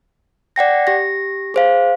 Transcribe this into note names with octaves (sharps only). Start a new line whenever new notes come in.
D5 F#5 G5 A#6
G4 A#6
G#4 C5 F5